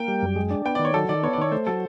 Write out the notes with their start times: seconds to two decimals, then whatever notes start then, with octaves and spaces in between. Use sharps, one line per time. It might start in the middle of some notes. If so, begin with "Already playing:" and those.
Already playing: A#3 G5
0.08 G3
0.22 F#2
0.36 G#3
0.51 D4
0.65 B3 G5
0.75 D5
0.79 D#3
0.85 C#5
0.94 F#3 A4
1.09 D#3 D5
1.23 B3 C#5
1.33 D5
1.38 D#3 C#5
1.52 A3 C5
1.67 F#3 A4